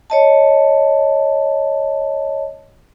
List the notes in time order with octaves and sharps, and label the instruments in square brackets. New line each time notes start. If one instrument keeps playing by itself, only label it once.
[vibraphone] C#5 D#5 A5